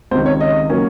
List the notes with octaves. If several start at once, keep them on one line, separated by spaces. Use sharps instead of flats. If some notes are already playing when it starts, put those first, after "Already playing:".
C#2 C3 D#3 C5
C#5
D#5
C#3 F#3 A#3 C#4